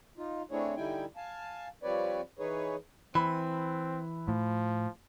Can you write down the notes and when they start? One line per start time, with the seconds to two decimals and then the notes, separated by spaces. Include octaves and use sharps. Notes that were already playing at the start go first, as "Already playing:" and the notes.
0.18 D#4 F4
0.51 A3 C4 D4 E4 G#4 C#5
0.76 D3 G3 D#4 E4 G5 G#5
1.16 F5 G#5 A5
1.83 F3 G3 C4 B4 C#5 D5
2.39 E3 D#4 G#4 B4 C#5
3.15 E3 C4 B5
4.28 A2 F3